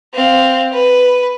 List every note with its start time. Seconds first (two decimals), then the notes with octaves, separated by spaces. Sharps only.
0.14 C4 F5
0.73 B4